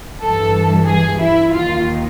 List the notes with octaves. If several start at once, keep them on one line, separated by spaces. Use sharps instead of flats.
G2 E3 A4
G#4
E4
D#2 D#3 F4